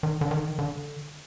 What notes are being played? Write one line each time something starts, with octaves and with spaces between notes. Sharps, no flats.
D#3
D3
D#3
D3